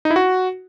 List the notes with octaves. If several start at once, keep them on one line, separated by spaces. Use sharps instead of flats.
D#4
E4
F#4